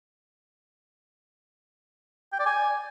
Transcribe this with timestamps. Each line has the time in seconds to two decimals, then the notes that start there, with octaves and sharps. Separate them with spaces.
2.33 G5
2.39 D5
2.46 G#5